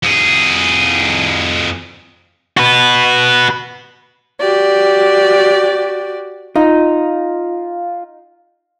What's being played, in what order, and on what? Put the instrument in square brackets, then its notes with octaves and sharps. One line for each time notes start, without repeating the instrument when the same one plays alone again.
[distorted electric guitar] F2 G#4
F#4 B4
[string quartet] F#4 G4 D5
[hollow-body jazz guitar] D#4 [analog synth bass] F4